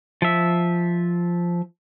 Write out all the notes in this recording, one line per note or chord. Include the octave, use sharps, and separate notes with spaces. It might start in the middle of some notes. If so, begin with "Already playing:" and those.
F3 E5